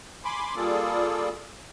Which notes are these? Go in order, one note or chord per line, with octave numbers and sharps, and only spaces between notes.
G#5 B5 C6 D6
G3 A#3 F4 G#4 A4 D5